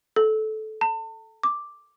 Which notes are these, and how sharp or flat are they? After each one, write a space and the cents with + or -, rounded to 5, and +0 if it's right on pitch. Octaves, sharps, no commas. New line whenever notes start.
A4 -15
A5 +40
D6 +0